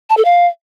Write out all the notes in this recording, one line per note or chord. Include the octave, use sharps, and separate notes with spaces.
A5
A4
F5